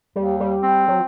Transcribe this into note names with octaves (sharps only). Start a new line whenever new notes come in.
D#2 G3
G3
C4
F#3